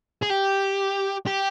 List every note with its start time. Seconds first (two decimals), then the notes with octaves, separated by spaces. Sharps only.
0.23 G#4
0.30 G4
1.26 G4